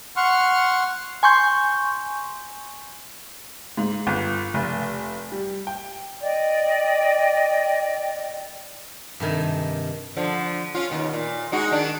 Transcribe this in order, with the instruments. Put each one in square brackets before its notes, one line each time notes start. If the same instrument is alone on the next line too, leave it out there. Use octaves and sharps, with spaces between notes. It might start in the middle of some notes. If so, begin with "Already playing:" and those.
[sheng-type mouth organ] F#5 C6 C#6 F6
[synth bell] G#5 C6 C#6 G6
[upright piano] G#2
G1
F1
G3
G5
[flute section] D5 D#5 G5
[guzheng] G2 C3 D#3 G#5
[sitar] D3 F3
C#4 F4
D#2 B2
A#2
G#3 D#4 F#4
D#3 D4